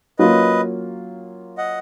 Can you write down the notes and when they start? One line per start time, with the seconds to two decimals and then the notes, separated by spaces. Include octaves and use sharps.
0.19 F#3 A#3 C#4 F4 B4 D#5
1.58 D#5 F#5